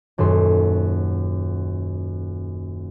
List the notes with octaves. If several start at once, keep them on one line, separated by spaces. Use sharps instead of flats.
D#1 F#2 A4 C6